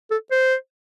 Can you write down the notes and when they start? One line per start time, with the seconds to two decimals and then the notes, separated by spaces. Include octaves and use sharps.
0.11 A4
0.31 C5